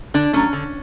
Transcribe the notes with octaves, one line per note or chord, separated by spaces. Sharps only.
D3 D4
F#3 A3 C#4
D3